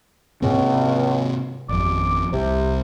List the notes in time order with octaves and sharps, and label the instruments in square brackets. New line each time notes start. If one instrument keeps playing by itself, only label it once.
[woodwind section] C#2 [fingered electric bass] G#2 C3 C4
[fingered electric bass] G#1 F2 [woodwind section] D6
[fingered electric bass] C2 [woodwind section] C3